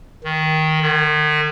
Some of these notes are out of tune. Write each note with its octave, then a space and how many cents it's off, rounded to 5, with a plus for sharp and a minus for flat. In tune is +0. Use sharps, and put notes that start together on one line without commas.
D#3 +10
D#3 -40